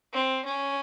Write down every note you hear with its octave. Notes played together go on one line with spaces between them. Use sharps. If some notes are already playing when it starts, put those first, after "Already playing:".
C4
C#4